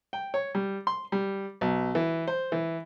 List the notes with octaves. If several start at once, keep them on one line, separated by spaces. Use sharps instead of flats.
G5
C#5
G3
C6
G3
B1
E3
C5
E3